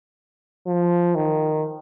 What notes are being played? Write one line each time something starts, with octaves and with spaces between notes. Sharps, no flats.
F3
D#3